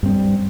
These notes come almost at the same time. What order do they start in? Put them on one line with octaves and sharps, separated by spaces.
G2 C4 G3